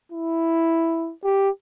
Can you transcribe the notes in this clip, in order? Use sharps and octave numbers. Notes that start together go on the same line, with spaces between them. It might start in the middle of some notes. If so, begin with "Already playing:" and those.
E4
G4